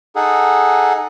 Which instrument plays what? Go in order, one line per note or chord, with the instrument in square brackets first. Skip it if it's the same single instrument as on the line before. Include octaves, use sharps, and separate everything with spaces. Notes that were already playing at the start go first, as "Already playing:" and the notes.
[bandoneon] D#4 G#4 A4 F#5